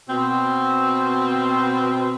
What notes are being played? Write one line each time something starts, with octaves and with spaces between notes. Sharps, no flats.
B2 C4